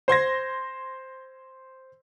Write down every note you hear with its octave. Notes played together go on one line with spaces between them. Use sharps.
C5 C6 G#6 A#6